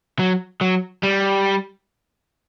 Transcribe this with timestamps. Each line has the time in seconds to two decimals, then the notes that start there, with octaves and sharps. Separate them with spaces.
0.19 F#3
0.61 F#3
1.03 G3